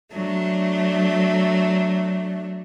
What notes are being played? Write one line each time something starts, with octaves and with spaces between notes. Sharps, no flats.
F#3 A3 D4